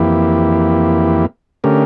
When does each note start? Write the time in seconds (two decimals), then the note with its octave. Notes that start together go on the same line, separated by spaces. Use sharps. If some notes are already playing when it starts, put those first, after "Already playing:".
Already playing: F2 E3 A#3 E4 G4
1.64 D3 A3 C#4 G4 A#4